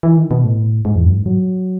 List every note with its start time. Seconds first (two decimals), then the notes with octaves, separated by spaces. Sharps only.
0.03 E3
0.17 D#3
0.31 B2
0.44 A2
0.85 G#2
0.95 E2
1.06 F#2
1.16 G#2
1.26 F#3